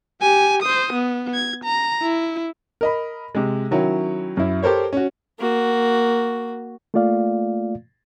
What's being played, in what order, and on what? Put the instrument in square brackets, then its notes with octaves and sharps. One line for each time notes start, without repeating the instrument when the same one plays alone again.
[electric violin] G4 G#5
C5 D#6
B3
G#6
A#5
E4
[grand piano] A#4 D#5 B5
C3 G#3
D#3 F#3 C#4 E4
F#2 E4
G4 A4 A#4 C5 C#5
C#4 F#4
[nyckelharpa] A#3 F#4
[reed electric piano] A3 A#3 F4 D5 F5